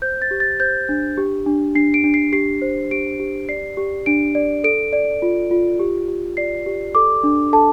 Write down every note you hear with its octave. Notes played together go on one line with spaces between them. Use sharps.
C5 G6
A6
G4
A6
C5 G6
D4
G4
D4
D4 C7
D7
D4
C7
G4 C7
C5
G4 D7
G4
D5 C7
G4
D4 D7
D5
A4 D7
D5
F4
F4
G4
G4
D5 C7
G4
A4 D6
D4
A4 A5